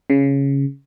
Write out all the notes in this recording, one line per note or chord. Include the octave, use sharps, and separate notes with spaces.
C#3